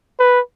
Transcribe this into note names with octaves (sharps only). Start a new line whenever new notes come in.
B4